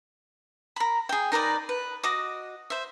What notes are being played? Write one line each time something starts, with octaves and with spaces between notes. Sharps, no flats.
A#4 B5
G#4 G5
D#4 A#4 B4 D5
B4
F#4 D#5 D6
C5 E5